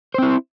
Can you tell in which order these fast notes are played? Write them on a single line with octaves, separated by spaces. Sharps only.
C5 C4 E4